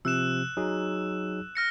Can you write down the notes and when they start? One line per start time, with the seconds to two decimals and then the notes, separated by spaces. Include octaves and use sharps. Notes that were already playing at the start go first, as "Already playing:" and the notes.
0.05 C3 F3 E6 F#6 E7
0.57 F#3 D#4 G#4
1.55 F6 A#6 C#7